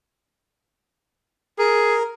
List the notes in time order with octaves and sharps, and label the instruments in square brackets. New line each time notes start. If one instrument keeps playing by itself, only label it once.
[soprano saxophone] G#4 [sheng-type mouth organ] A#4